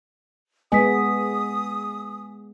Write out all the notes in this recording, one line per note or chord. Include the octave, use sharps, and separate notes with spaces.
G#3 B3 D#5 G#5 D#6 B6